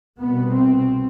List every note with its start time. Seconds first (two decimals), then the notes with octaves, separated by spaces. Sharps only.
0.20 C2 B2 B3
0.56 C4